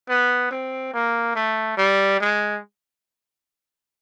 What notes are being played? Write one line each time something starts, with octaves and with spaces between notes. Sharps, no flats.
B3
C4
A#3
A3
G3
G#3